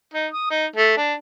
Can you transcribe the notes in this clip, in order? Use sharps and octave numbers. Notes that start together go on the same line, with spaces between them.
D#4
D#6
D#4
A3
D4